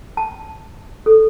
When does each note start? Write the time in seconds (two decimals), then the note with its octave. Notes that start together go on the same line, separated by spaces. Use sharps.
0.17 A5
1.06 A4